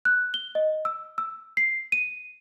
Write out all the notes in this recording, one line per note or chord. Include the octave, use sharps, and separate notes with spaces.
F#6
G7
D#5
E6
E6
C7
D#7